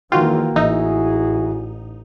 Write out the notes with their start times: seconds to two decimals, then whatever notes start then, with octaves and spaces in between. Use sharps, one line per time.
0.12 G#1 F2 D#3 E3 A#3 F4 F#4 G5
0.56 A1 E3 D#4 E4 F#4 G#4 E5